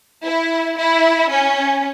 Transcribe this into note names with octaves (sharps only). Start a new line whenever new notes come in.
E4
E4
C#4